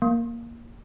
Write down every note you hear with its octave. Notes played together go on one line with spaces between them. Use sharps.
A#3